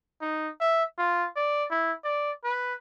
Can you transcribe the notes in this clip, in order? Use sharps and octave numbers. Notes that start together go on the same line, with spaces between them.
D#4
E5
F4
D5
E4
D5
B4